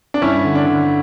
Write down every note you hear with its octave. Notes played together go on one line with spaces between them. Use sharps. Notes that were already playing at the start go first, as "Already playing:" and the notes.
D4
G2 C#4 E4
D3
D4
D3